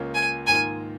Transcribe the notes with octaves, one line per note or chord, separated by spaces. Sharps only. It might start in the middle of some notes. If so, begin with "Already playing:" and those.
Already playing: C#2 C#3 A#3 C#4 F4
G#5
G#2 D#3 A#3 F4 G#5